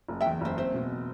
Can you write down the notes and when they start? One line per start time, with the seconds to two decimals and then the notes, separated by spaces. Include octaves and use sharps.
0.09 F#1
0.21 E5 G5
0.26 E2
0.41 F#1 C5 E5
0.57 C4 C5 E5
0.74 B2